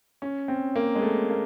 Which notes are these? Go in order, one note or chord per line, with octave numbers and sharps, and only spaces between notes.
C#4
C4
A#3
G#3
A3
A#3